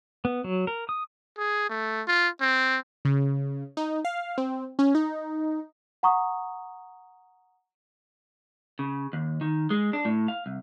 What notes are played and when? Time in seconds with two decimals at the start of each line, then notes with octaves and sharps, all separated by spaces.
0.25 B3
0.44 F#3
0.67 A#4
0.89 D#6
1.38 G#4
1.69 A3
2.08 F4
2.41 C4
3.05 C#3
3.77 D#4
4.05 F5
4.38 C4
4.79 C#4
4.95 D#4
6.03 F#5 A#5 C#6 D#6
8.79 C#3
9.13 D#2
9.41 D#3
9.70 G#3
9.93 D4
10.05 A2
10.28 F5
10.46 C2